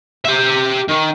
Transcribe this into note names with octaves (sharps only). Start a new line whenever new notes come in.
G4 E5
D#3